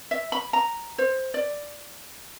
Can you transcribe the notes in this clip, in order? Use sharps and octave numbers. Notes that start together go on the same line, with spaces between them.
E5
B5
A#5
C5
D5